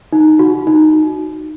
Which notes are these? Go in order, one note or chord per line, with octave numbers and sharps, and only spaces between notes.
D#4
F#4
D#4